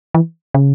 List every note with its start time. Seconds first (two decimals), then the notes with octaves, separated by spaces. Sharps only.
0.14 E3
0.54 C#3